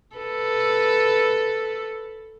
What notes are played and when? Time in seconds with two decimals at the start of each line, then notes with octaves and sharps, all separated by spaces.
0.16 A4 B4